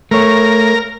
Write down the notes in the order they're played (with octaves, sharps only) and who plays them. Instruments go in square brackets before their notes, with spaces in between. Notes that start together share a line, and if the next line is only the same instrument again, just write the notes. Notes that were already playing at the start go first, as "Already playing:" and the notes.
[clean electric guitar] A3 C#5 [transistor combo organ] A#4